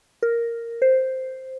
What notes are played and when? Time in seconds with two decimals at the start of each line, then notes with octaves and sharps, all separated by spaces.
0.23 A#4
0.82 C5